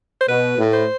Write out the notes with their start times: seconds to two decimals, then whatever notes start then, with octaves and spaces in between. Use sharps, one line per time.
0.21 C5
0.28 B2 B4
0.58 A2
0.73 C5